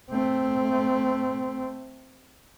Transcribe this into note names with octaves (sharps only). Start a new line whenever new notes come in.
A3 C4